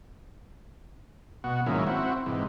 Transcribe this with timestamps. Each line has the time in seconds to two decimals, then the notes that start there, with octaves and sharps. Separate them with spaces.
1.44 B2 F#4
1.66 G#2 D#3 F#3 A#3 C#4 E4
1.87 C4 E4 F#4
2.26 G#2 C3 E3